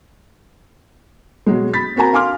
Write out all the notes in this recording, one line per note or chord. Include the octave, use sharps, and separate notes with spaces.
B2 F#3 G#3
B5 A6 B6
C4 F#4 A#4 G#5 A#5
F5 G#5 C6 D6 F6